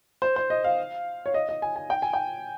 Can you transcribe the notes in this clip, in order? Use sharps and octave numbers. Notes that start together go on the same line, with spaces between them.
C5
C5
D#5
F5
C#5
D#5
D#5
G#5
G#5
G5
G#5
G5